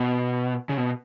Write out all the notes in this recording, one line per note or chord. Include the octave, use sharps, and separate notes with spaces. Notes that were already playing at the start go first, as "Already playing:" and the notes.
Already playing: B2
C#3
B2